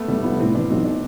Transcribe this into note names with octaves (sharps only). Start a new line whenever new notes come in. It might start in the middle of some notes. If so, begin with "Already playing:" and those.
Already playing: A3 B3 A4
F1 G3
F3 B3
A2 C4
E3 D4
D4
B1 C4
D4